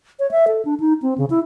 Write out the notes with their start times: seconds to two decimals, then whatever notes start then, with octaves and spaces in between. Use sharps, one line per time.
0.19 C#5
0.31 E5
0.48 A4
0.65 D4
0.80 D#4
1.02 C4
1.18 C#3
1.30 E4